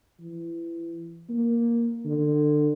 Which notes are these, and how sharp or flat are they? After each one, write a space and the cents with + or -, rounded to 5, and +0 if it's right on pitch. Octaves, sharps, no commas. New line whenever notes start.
E3 +25
A#3 +5
D3 +25